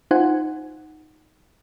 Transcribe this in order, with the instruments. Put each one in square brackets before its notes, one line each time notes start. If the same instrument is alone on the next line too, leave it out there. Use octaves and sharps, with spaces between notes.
[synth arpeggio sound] D#4 F4 C5 F#5 G#5